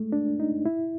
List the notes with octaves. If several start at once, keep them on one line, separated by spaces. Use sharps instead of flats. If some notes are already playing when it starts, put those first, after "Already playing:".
Already playing: G#3 A3
D4
D#4
E4